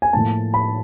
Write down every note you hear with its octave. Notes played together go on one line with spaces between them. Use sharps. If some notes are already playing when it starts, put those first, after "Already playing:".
G#5
A2 F3 A#3 A5
B5